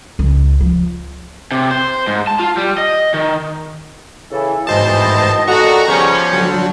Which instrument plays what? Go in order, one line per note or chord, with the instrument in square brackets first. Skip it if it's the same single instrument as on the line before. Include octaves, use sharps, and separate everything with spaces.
[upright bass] C#2
F3
[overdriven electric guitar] C3
C5
G#2
A5
F4
G3
D#5
D#3
[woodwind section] C#3 A4 [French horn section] E3
[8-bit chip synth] G#2 C5 A5 [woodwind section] B2 D#3 D#5 [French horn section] E3
[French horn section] A#2 A4 [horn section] F#4 [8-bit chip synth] A#5 C#6
[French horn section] C#3 B3 [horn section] F3 G3 C#4
[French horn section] D3 [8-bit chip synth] F#3